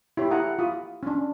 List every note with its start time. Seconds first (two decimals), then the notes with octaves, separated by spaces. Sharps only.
0.17 E4 G4 C#5
0.31 E4 A4 F#5 A#5 D#6
0.59 F4 B5 D#6
1.03 C#4 D4